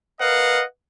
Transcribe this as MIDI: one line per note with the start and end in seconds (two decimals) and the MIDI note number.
0.21 0.62 70
0.21 0.62 71
0.21 0.62 75
0.21 0.62 77
0.21 0.62 78